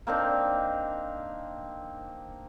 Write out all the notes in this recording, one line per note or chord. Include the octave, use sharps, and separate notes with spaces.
A#3 C4 D4 D#4